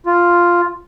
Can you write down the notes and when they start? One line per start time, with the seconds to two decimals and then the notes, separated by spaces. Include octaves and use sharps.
0.06 F4